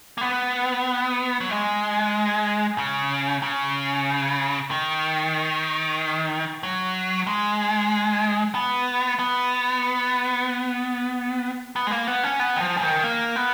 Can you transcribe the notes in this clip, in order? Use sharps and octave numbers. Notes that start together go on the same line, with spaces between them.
A#3
B3
F#3
G#3
C#3
C#3
D#3
F#3
G#3
B3
B3
B3
G#3
A#3
B3
C#4
B3
D#3
F3
C#3
D#3
A#3
B3